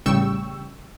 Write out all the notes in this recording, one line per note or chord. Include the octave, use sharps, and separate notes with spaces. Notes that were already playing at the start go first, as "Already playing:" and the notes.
A1 C#3 G3 G5 C#6 E6